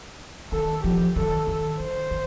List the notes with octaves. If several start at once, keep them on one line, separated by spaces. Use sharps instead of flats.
D#3 A4
F3 G4
D#3 A4
D#3
D#3 C5
D#3